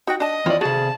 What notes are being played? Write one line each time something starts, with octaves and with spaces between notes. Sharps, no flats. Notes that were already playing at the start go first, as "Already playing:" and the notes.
D#4 F#4 G5
D4 D#5 A5
E2 C4 F4 C#5 D5
C3 F#4 G#4 A4 A5